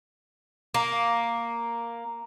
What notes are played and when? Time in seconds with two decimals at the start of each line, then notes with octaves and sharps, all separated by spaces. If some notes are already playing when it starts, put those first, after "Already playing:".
0.74 A#3